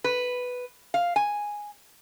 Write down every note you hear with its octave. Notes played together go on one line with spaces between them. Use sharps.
B4
F5
G#5